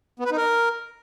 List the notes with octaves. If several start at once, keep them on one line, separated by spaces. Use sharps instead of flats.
B3
B4
D#4
A#4